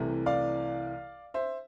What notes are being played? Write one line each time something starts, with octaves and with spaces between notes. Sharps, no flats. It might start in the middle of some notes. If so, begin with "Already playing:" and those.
Already playing: C2 C3 E3 A3
D5 F5
C5 E5